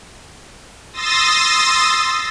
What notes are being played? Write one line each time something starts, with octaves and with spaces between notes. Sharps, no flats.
C6 D#6 E6 A6 A#6